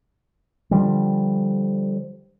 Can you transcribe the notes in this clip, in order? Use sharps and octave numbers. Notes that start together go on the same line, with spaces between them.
D3 F3 G3